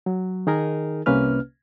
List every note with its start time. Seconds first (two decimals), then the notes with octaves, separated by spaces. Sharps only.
0.06 F#3
0.47 D#3 D#4 G#4 A#4
1.06 C2 C3 A#3 C#4 B4 F6